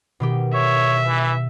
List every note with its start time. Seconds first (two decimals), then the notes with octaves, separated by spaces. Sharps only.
0.20 B2 D#3 G4
0.54 C#5 E5
1.08 E3